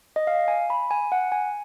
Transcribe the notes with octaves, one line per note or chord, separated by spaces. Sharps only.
D#5
F5
G#5
B5
G#5
F#5
G#5